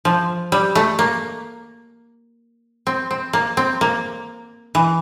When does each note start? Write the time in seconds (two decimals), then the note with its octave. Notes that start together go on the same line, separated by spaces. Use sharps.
0.05 F3
0.52 G3
0.75 A3
0.99 A#3
2.87 C4
3.11 C4
3.33 A#3
3.57 C4
3.81 A#3
4.75 E3